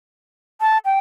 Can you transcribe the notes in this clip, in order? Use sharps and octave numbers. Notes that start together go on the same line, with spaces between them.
A5
G5